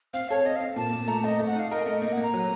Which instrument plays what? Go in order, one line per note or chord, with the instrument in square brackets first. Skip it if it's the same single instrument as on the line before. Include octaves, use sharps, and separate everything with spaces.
[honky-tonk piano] C4 [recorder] F5
[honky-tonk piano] A4 [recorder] C#5
[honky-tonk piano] C4 [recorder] D#5
[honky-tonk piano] C4 [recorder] F5
[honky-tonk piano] A#2 [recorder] A5
[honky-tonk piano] A#2
[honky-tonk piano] A3 [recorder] A#5
[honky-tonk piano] A3 [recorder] D#5
[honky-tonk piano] A3
[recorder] F#5
[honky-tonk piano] D#4 [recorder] F5
[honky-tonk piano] A#4 [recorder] D#5
[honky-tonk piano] A3 [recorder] D#5
[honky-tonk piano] A#3 [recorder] D#5
[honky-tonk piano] A#3 [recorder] F#5
[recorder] A#5
[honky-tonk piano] F#3